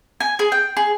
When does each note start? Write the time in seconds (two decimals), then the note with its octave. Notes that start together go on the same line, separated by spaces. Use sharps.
0.20 G#5
0.39 G#4
0.52 G5
0.77 G#4